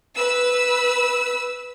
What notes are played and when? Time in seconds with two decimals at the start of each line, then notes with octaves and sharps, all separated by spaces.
0.15 B4 E6